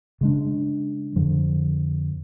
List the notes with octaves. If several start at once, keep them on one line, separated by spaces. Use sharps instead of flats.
C#3 G#3 D4
F2 D3 F3